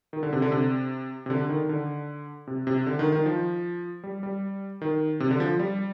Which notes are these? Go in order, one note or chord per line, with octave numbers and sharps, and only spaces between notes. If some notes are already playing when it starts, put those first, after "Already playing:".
D#3
D3
C3
D3
C3
C3
D3
D#3
D3
C3
C3
D3
D#3
D#3
F3
G3
G3
D#3
C3
D3
F3
G3